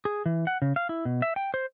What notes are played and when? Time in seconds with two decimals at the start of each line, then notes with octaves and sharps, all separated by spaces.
0.05 G#4
0.26 E3
0.47 F#5
0.62 C#3
0.76 F5
0.89 E4
1.05 B2
1.22 E5
1.36 G5
1.54 C5